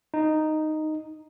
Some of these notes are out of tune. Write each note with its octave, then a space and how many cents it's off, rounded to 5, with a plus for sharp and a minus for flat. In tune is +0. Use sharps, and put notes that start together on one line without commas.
D#4 -5